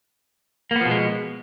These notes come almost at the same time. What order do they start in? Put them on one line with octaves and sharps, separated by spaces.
A#3 B3 F3 B2 G#3